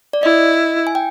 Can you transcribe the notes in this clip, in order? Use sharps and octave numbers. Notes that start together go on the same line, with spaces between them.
D5
E4 D#5
G#5
G5